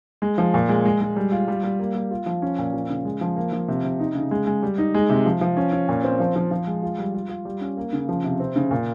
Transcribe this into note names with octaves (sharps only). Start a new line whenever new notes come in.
G#3
F3
A#2
G#3
G#3
G#3
G3
F4
G3
G3
A#3
G3
F4
F3
C#4
A#2
F3
C#3
G#3
F3
A#3
F3
C3
C3
D#4
C#3
G#3
G#3
G3
D#4
G#3
C3
F3
F3
C#4
C#4
A#2
C4
F3
F3
F3
G#3
F4
G3
F4
F4
G3
C#4
A#3
C#3
F3
C3
C4
C#3
A#2